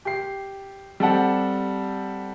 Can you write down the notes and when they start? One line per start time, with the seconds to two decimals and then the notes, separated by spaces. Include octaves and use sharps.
0.05 G4 C7
1.00 G3 C4 G4 A4 F#5